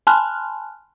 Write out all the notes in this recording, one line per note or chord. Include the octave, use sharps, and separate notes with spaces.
G#5 A5 B5 C6 F6 F#6